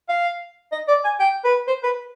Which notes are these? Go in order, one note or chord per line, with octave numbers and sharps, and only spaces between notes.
F5
D#5
D5
G#5
G5
B4
C5
B4